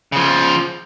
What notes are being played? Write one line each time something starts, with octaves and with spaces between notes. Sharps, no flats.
C#3 F3